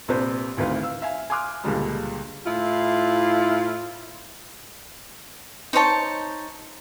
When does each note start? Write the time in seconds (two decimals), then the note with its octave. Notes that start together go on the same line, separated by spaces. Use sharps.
0.08 A#1 C3 D4 B4 C5
0.57 A1 D2 D#3 C4 B4 F5
0.83 F5 E6
1.02 E5 F5 G#5
1.30 G#5 C6 D6 D#6 F6 F#6
1.64 C#2 A#2 D3 G3 G#3
2.45 A2 E4 F4
5.73 D#4 C5 C#5 A5